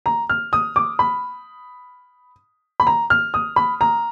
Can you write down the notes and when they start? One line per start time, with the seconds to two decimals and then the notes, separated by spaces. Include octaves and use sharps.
0.06 A#5
0.29 F6
0.53 D#6
0.76 D6
0.99 B5
2.80 B5
2.87 A#5
3.10 F6
3.34 D#6
3.56 B5
3.81 A#5